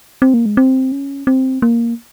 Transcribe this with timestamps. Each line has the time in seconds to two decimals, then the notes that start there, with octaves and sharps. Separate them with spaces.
0.22 C4
0.34 A#3
0.46 G#3
0.57 C4
0.92 C#4
1.27 C4
1.62 A#3